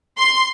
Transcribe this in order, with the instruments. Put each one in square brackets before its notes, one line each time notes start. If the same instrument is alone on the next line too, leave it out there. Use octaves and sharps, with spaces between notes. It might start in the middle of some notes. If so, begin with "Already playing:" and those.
[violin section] C6